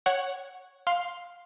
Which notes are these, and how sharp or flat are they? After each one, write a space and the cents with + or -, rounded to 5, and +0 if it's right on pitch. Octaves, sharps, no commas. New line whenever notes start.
C#5 -5 F#5 +0
F5 +10 C6 +0